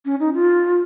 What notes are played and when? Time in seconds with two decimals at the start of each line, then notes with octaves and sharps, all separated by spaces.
0.05 C#4
0.20 D#4
0.34 F4